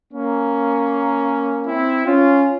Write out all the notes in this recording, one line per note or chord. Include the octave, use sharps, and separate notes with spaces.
A#3 C#4
C4 E4
C#4 F4